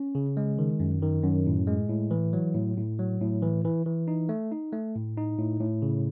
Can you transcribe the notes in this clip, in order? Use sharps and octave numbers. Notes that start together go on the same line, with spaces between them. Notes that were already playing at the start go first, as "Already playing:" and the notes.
Already playing: C#4
C#3
G#3
D#3
F#2
D#3
F#2
A2
G#3
A2
E3
F#3
A2
A2
F#3
A2
E3
E3
E3
D#4
A3
D#4
A3
A2
D#4
A2
A2
C#3